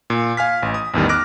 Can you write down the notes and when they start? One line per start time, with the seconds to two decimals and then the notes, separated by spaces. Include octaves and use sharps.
0.10 A#2
0.37 F5 G#5 F6 B6
0.63 A1
0.74 D#6
0.94 A1 E2 D#3 G3
1.09 D6 F6 F#6 A#6 D7